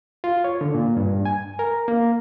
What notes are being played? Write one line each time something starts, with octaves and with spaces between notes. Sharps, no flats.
F4
C#5
D3
A#2
G2
G#5
A#4
A#3